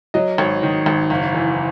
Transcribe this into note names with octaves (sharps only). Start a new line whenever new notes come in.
F#3 D#5
G#1 C#5
D#3
G#1
F#1
E3